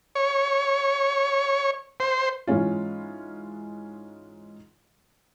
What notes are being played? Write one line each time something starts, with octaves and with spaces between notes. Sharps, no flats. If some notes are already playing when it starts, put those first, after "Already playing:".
C#5
C5
G#2 E3 G#3 C#4 F4